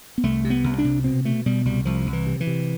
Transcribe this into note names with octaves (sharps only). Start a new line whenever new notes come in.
B3
C2 A3
C3
B3
C2
D4
C3
B2 C4
B2 A3
B2 G3
C2 G3
C2 F3
C2
E3
C3
E3
C3